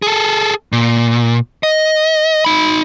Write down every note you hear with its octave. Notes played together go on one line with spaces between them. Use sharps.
G#4 A4
A#2
D#5
D#4 B5